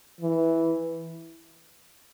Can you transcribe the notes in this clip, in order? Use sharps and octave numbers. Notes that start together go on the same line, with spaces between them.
E3